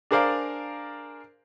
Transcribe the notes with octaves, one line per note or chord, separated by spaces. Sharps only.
D4 G#4 A#4 C5 D5 F5